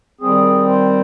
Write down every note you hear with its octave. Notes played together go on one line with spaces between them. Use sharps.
D#3 G3 C4 G#4
C5